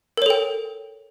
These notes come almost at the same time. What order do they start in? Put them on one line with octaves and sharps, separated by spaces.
A#4 C#5 A4 G5